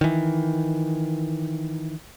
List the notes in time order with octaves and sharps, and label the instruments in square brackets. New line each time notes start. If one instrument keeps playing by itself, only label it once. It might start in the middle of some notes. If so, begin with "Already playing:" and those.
[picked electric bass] D#3 E3